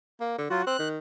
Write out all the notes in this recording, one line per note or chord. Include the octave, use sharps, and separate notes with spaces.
A#3
D3
F#3 F4 F#4
C4 F#6
D#3